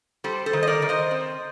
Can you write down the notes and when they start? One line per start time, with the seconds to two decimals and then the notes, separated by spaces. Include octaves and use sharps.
0.24 G3 A4 C5
0.46 A4 C5
0.53 D#3
0.63 D#5
0.67 A#4 D5
0.82 D#3
0.89 C5 D#5
1.11 C4